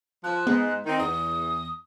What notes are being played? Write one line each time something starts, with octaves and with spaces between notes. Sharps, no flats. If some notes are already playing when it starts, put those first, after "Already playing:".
F3 F#6
G#2 G#3 B3
D#3 C4 D#4
E2 D#6